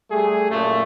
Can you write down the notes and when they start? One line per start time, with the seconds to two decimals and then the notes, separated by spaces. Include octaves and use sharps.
0.11 G3 A3 G#4
0.50 F#2 A#2 A3